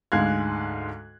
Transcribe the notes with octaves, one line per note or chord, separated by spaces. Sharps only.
D2 G#2 G#3 F5 F#6 G#6